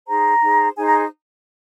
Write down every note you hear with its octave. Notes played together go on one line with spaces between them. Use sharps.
D#4 G#4 C5 A#5
D#4 G#4 C5
D#4 G#4 C5 G#5
A#5